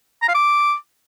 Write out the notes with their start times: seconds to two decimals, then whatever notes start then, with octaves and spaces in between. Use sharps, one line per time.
0.22 A#5
0.28 F5
0.34 D6